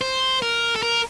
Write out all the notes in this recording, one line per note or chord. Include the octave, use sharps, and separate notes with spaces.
C5
A#4
A4
A#4